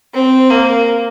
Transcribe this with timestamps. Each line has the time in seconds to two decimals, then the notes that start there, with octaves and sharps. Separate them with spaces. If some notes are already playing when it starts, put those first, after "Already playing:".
0.14 C4
0.51 A#3